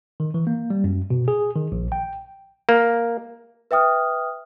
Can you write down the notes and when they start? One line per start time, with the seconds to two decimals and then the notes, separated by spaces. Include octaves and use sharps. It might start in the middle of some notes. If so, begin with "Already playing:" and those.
0.20 D#3
0.34 E3
0.47 A#3
0.70 G3
0.84 F#2
1.10 B2
1.28 G#4
1.56 D#3
1.72 A#1
1.92 G5
2.69 A#3
3.71 B4 E5 G5 D#6 F6